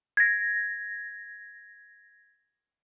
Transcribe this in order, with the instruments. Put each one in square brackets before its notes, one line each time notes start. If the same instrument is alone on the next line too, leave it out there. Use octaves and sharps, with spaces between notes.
[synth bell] G#6 A#6